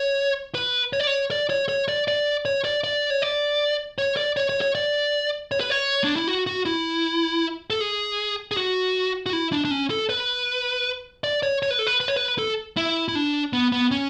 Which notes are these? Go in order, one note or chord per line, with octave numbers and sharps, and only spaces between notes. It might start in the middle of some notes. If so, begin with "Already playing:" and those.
Already playing: C#5
B4
C#5
D5
C#5
D5
C#5
C#5
D5
D5
C#5
D5
D5
C#5
D5
C#5
D5
C#5
C#5
C#5
D5
C#5
B4
C#5
D4
E4
F#4
F#4
E4
A4
G#4
G#4
F#4
F#4
E4
D4
D4
C#4
A4
B4
D5
C#5
C#5
B4
A4
B4
B4
C#5
B4
A4
E4
E4
D4
B3
B3
C#4